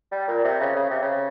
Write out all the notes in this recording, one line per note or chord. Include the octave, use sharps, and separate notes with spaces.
G3
A#2
C3
C#3
C#3
C3
C#3